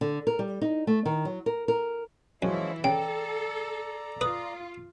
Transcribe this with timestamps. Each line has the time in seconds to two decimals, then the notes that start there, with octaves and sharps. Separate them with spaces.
0.01 D3
0.27 A#4
0.39 G3
0.61 D#4
0.87 A3
1.05 D#3
1.25 F#3
1.46 A#4
1.68 A#4
2.42 F#2 E3 F3 G#3 C#4 E4
2.84 C#3 A4 D5 G5 A#5
4.21 F4 B4 D#6